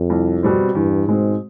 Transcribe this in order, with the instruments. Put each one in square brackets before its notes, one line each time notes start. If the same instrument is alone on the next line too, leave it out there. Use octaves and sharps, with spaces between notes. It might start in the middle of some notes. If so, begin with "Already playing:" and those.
Already playing: [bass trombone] F2
[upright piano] C2
B2 G3 C4
[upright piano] E2 [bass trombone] G2
[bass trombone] G#2 [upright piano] B2 G#3 C4